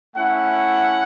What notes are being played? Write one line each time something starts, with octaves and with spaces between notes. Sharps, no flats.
A3 C#4 E4 F#5